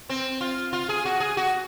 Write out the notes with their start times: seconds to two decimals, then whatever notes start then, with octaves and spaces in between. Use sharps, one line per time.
0.09 C4
0.41 F4
0.73 F4
0.89 G#4
1.05 F#4
1.20 G#4
1.37 F#4